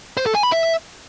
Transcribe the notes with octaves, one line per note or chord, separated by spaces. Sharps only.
C5
A4
G#5
B5
E5